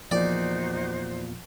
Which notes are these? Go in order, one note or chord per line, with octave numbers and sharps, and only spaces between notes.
E2 A#2 F3 D#4 F#4 C5 D5